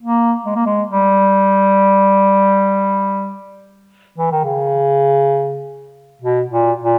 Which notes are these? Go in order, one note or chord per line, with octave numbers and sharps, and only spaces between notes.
A#3
G#3
A#3
G#3
G3
E3
D#3
C#3
B2
A#2
A#2